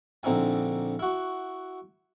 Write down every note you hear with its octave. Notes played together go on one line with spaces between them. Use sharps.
A#1 D3 C4 D#4 E4 G#5
E4 F#4